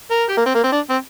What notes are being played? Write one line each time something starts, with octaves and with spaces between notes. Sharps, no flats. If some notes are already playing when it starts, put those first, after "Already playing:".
A#4
G4
A#3
C4
A#3
C4
D4
C4